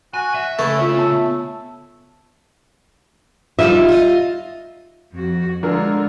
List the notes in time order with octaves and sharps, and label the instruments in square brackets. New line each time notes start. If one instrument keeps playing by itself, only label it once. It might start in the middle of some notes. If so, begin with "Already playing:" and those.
[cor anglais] F#4 [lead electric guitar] G#5
[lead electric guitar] E5
[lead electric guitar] C#3 [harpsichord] A3 [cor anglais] E4
[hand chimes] F4 C#5 [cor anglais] E5
[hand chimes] B3 A5
[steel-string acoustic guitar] G3 D#4 F4 [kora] E5
[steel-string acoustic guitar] F4 D#5
[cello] F2 F#4
[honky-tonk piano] D3 A#4 [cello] G#3 F4